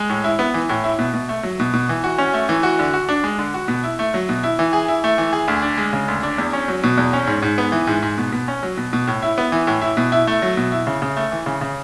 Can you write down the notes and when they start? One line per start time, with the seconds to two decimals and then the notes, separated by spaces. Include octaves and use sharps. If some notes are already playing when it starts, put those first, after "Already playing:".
Already playing: G#3
0.09 A2
0.24 E4
0.39 B3
0.54 E3
0.69 A2
0.84 E4
0.99 B2
1.13 B2
1.29 A3
1.43 F#3
1.60 B2
1.73 B2
1.89 E3
2.04 F#4
2.18 C#4
2.34 A3
2.49 E3
2.63 F#4
2.79 D3
2.93 F#4
3.09 D4
3.24 G#3
3.39 D3
3.54 F#4
3.68 B2
3.84 E4
3.99 A3
4.14 F#3
4.29 B2
4.43 E4
4.59 E3
4.73 G#4
4.88 E4
5.04 A3
5.18 E3
5.33 G#4
5.48 D2
5.62 D4
5.77 G#3
5.93 C#3
6.08 D2
6.23 D4
6.38 E2
6.53 C#4
6.68 F#3
6.83 B2
6.97 E2
7.13 C#4
7.27 G#2
7.42 G#2
7.58 B3
7.72 E3
7.87 G#2
8.02 G#2
8.18 B2
8.32 B2
8.48 C#4
8.63 F#3
8.77 B2
8.93 B2
9.07 A2
9.22 E4
9.38 B3
9.52 E3
9.67 A2
9.82 E4
9.97 B2
10.12 E4
10.27 A3
10.42 F#3
10.57 B2
10.72 E4
10.87 C#3
11.02 C#3
11.17 A3
11.32 E3
11.46 C#3
11.61 C#3